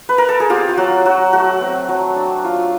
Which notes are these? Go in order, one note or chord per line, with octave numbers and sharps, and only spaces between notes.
B4
A#4
A4
G#4
C4 F4 G4
F4
F#3 F#4
F#3 F#4
A3 F#4
C4
F#3
D4
F4